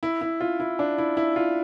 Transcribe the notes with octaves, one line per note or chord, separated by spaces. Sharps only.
E4
E4
F4
E4
D4
E4
E4
F4